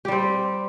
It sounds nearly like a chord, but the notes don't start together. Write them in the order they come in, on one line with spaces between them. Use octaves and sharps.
G4 G3 C4